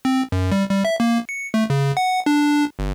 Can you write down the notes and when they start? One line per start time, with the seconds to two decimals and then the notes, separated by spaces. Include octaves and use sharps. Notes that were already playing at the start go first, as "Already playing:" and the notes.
0.05 C4
0.32 F#2
0.52 G3
0.70 G3
0.85 E5
1.00 A#3
1.29 C#7
1.54 A3
1.70 C#3
1.97 F#5
2.26 D4
2.79 G1